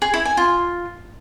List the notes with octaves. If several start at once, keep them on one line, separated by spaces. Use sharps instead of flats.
G#4
E4
G#5
F4